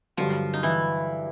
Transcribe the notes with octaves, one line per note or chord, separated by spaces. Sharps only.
G2 D3 F3 F#3 F4
D#4
E3 E4